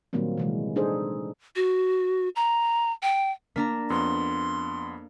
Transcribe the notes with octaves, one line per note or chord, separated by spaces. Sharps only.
A#2 D#3 F#3 G3 A#3 C4
C3 E3 G#3
D4 D#4 G#4 A4 C5
F#4
A#5
G5
A#3 D4 A#5 B6
F2 B3 C6